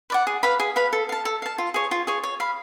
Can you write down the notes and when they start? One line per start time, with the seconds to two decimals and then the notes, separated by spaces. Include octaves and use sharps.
0.10 B4 D5 F#5
0.27 G#4
0.43 B4 F5 B5
0.60 G#4
0.76 B4 F5 B5
0.93 A4
1.09 F5 A5
1.25 A4
1.42 F5 A5
1.58 F4
1.74 G#4 C#5
1.91 F4
2.07 G#4 C#5
2.24 C#5
2.40 F5 B5